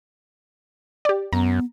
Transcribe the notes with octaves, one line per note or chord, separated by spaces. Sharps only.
G4 D5
F#2 B3 A#5